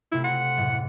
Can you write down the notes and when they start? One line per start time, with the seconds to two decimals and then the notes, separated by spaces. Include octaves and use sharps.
0.12 C3 A3 E4 F4
0.24 F#5 C6
0.57 F#1 A2 C#7